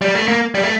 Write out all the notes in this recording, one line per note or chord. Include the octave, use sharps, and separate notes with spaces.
G3
A3
A#3
G3
A3